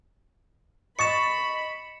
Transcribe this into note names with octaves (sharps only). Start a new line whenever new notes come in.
D#5 B5 C#6 A6 C#7 E7